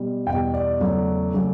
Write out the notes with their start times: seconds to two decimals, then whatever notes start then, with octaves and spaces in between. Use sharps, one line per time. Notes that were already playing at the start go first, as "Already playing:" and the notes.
Already playing: B2 G3
0.27 E2 B2 G3 G5
0.54 D5
0.80 E2 C#3 F#3 A3
1.34 C#3 F#3 A3